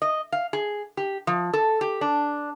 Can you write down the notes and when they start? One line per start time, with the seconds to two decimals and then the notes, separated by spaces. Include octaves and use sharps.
0.02 D#5
0.32 F5
0.53 G#4
0.97 G4
1.27 F3
1.53 A4
1.81 G4
2.01 D4